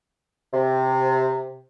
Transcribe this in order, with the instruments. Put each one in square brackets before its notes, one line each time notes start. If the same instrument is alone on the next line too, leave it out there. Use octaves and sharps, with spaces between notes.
[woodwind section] C3